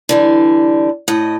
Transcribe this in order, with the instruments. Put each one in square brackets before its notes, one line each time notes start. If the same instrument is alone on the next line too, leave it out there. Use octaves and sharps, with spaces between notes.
[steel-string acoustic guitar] D3 E3 G3
A2 D#5